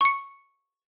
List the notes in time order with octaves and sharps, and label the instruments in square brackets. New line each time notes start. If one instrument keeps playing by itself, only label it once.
[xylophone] C#6 C#7